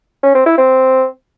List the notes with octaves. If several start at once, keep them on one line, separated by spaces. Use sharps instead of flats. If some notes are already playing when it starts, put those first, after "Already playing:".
C#4
C4
E4
C4